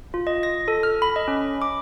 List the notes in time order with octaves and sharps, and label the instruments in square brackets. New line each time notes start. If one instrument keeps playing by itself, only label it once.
[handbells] F4
D#5
A#6
A4
F6
B5
D#5
C#4
D6